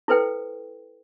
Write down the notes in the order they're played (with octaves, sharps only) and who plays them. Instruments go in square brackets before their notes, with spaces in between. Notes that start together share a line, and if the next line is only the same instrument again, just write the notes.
[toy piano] E4 A4 B4 C5 G5